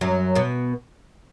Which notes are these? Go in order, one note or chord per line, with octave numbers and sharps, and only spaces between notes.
F#2 F#3
B2 B3